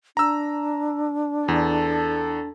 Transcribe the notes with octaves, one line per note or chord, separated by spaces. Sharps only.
D4 A#5 E6
E2 A4